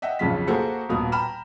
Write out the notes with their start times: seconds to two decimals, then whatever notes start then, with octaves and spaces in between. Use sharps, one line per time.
0.02 D#5 E5 F#5 G5
0.19 B1 F2 C#3 F4 B6
0.47 A#3 F#4 G#4 A4 C5
0.89 D#1 B2 A#3 B3 D#6
1.12 G5 A#5 B5 F6 E7